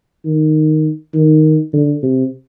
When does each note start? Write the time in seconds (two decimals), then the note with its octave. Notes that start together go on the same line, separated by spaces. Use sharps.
0.25 D#3
1.14 D#3
1.73 D3
2.03 C3